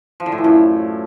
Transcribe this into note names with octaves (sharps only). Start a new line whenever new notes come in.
F3
D3
A2
E3
F#2